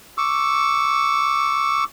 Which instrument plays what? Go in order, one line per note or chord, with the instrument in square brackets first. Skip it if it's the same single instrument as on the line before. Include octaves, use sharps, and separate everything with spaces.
[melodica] C#6 D6 E6